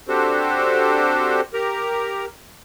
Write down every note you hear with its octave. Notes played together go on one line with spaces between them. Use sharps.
C4 D4 F#4 G4 A4 C5
G4 A#4 A#5